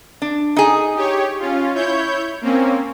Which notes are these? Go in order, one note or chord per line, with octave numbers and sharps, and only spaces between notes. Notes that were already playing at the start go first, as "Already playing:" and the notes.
D4
D#4 G#4
G4 C#5
C#4 F4
E4 C#5 G6
A#3 C4 C#4